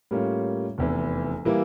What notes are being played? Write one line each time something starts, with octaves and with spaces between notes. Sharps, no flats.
A2 G3 A#3 C#4 F4
F1 E2 E3
E3 G3 A#3 E4